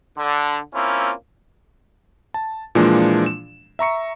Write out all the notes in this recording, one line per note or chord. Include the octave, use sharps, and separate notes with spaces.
D3
A#3 C4 C#4 E4 F4
A5
A#2 E3 F3 G#3 A#3 D4
E7
E5 A#5 C#6 C#7